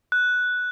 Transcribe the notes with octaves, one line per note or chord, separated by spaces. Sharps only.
F#6